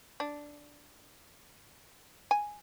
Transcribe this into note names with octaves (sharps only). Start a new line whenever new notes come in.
D4
G#5